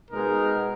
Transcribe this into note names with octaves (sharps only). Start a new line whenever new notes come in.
B2 G#3 B3 D#4 A#4